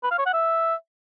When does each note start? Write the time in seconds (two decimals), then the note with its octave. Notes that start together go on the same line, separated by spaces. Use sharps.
0.03 B4
0.11 F5
0.18 C#5
0.26 F#5
0.33 E5